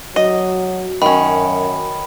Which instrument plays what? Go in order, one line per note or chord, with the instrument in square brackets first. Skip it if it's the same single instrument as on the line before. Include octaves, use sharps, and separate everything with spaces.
[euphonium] F#3 [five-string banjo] D#5
[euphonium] F#2 [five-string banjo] D#3 C#4 [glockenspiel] B5